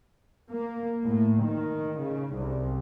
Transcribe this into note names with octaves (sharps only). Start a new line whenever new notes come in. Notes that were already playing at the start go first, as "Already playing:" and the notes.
A#3
A2
D#3
C#3
C2